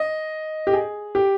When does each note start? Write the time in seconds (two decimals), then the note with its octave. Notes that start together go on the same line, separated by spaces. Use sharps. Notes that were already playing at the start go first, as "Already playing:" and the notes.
Already playing: D#5
0.67 G4
0.73 G#4
1.15 G4